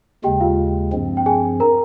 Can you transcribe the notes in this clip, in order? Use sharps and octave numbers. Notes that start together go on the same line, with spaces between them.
D#2 C#3 G#3 G4 G5
F4 F5
G2 F3 C4
G5
G#4 G#5
A#4 A#5